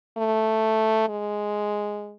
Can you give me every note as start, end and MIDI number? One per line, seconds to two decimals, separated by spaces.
0.18 1.07 57
1.09 2.15 56